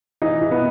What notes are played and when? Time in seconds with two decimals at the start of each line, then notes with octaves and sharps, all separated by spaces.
0.22 E3 D#4
0.41 E3
0.51 B3